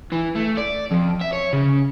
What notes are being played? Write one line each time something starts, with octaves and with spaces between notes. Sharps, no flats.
E3
A3
D5
F2
E5
C#5
C#3